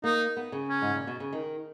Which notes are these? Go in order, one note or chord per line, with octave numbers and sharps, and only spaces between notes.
A#3 D#4
B3
C#3
C#4
G#2
A#2
B2
C#3
D#3